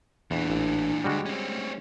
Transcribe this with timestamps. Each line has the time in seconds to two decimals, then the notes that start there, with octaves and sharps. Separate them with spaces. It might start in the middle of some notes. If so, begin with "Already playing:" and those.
0.31 E2 A#2 E3 D4
0.50 A1
1.04 D2 G#2 G3 G#3 F#4
1.26 C4 C#4
1.47 A3